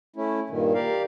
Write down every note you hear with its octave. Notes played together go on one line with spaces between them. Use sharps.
A3 C#4 E4
G2 A#2 D#3
G4 A#4 D5 F5